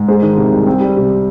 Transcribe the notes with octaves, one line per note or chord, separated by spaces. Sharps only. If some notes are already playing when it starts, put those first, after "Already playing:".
Already playing: G#2
G#3 C5
D#3
C3
C2
C4
G3
C3